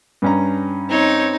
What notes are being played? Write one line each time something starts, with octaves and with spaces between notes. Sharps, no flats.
G2 C#4 A#5
C4 D#4 C#5